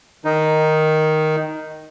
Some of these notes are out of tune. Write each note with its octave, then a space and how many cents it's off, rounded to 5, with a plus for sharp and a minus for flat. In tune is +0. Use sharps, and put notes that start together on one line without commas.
D#3 +0 D#4 +0